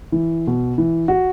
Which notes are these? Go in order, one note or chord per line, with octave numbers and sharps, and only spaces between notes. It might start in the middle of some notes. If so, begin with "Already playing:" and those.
E3
B2
E3
F#4